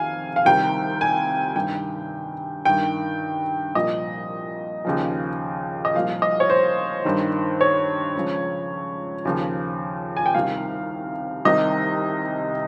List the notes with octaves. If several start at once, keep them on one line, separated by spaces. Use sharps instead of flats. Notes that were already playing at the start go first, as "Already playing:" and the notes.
Already playing: F2 C3 D#3 F5 G#5
F5
C2 C3 D#3 G5
G#5
G2 D#3 G5
G2 D#3 G5
C2 A#2 F3 D#5
D#2 C#3 F3
D#5
C2 A#2 F3 F5
D#5
C#5
C5
G2 D#3
C#5
C#2 C#3 F3
D#2 C#3 F3
G#5
G5
C2 C3 D#3 F5
C2 C3 D#3 D#5